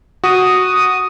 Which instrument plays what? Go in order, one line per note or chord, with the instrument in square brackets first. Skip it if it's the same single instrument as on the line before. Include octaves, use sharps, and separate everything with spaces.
[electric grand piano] F#4 [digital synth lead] D#6